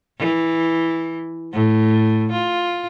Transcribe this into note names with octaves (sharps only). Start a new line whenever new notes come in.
E3
A2
F4